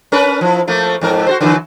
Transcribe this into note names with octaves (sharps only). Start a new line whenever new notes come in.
C#4 A#4 B4
F3 E4
F3 A3 A#3
F2 G#2 A#4
F#4 A4 C5
D3 E3 F#3